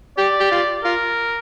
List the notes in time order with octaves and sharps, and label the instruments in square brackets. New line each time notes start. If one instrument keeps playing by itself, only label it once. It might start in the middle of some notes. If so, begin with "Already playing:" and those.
[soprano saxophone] G4 [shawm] D5
[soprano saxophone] G4
F4
[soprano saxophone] F4 [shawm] A#4